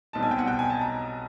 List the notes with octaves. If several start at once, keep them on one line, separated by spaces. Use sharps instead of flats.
B1 B2 G3 C4 D#4 A5
G#5
G5
F#5
G5
G#5
A5
A#5